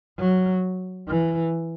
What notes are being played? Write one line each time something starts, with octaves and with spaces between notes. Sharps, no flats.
F#3
E3